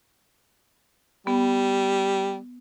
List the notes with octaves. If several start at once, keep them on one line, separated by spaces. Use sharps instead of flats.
G3 B3